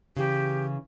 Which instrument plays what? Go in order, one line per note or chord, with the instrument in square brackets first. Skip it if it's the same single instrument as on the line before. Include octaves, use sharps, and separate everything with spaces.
[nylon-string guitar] C#3 E3 [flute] G4